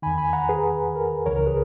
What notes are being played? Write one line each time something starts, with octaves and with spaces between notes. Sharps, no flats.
E2 D#3 G#5 B5
G#5 B5
F#5 A#5
G#4 B4
A#4
C#2 C#3 E3 A#4 C#5
A#4
G#4 B4